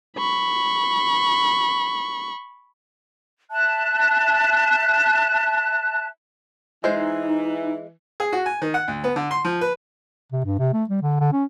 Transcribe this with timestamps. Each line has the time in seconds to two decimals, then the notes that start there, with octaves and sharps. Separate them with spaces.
0.18 B5 C#6
3.51 E5 A5 F#6
6.84 E3 G#3 D#4 C5
8.20 G#4
8.33 F#4
8.46 G#5
8.62 D#3
8.74 F#5
8.88 D2
9.04 B3
9.16 D3
9.31 C6
9.45 F3
9.61 B4
10.32 C3
10.45 G2
10.59 C3
10.73 A3
10.90 G3
11.02 D3
11.21 D3
11.33 C#4